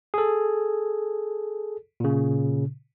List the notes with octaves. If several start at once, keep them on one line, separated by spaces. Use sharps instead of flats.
G#4 A4
A#2 C#3